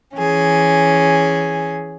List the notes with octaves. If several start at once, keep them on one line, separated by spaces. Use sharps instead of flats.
E3 C#4 G#4